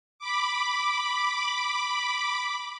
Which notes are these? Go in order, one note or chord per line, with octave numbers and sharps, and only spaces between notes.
B5 D6